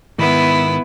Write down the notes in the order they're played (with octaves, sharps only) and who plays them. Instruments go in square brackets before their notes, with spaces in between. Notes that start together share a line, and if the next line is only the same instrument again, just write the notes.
[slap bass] G#2 D#3 [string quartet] B3 E4